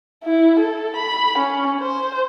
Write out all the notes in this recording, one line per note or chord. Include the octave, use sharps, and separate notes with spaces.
E4
A4
B5
C#4
C5